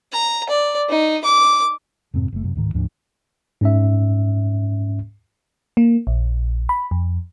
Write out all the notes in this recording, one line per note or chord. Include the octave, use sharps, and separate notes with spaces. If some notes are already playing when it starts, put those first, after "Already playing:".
A#5
D5
D#4
D6
F2 G#2 C3 C4
F#1 A3
F#2 C3
D1 G#2 D#3
D2 G#2 F3 D4
G#2 C#4 E5
A#3
A#1
B5
F2